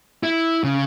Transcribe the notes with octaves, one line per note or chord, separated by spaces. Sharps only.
E4
C#3